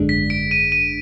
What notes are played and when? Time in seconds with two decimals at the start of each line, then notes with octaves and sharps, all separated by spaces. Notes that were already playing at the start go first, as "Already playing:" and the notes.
Already playing: G#1 F#2 D3 G#3 D4
0.09 B6
0.30 D7
0.51 D#7
0.72 D#7